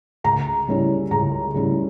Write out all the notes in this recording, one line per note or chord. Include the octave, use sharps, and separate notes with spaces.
C#2 A#5
C#3 G3 C#4 E4
C#2 A#5
C#3 G3 C#4 E4